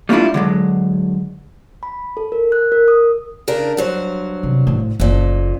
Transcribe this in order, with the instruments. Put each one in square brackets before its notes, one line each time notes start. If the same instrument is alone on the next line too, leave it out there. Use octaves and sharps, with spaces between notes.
[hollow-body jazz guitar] G3 A3 A#3 D4 E4 F4
D3 F#3 G#3
[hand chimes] B5
A4
A#4
F#6
A#4
D#6
[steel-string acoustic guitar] C#3 D4 A#4
G2 F#3 C5
[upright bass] C3
A2
[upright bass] F#1 [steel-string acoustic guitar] F2 A#2